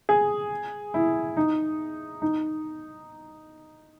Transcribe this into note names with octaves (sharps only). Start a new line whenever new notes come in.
G#4
E4
D#4
D#4